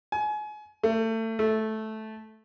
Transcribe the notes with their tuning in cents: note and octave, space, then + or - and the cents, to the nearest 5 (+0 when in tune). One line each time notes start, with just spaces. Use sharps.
G#5 +30
A3 +30
A3 -10